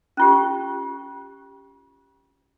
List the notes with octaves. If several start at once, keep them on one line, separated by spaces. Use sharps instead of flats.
C#4 F4 G4